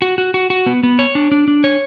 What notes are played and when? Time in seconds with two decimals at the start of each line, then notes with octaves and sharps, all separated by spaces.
0.02 F#4
0.18 F#4
0.34 F#4
0.50 F#4
0.66 B3
0.83 B3
0.99 C#5
1.15 D4
1.32 D4
1.48 D4
1.64 C#5